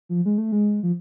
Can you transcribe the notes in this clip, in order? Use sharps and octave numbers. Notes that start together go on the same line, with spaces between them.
F3
G#3
A3
G#3
F3